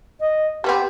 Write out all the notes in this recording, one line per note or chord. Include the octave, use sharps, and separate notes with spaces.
D#5
G3 B3 C4 G4